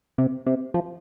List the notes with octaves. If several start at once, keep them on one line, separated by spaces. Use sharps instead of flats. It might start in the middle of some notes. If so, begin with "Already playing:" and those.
C3
C3
F3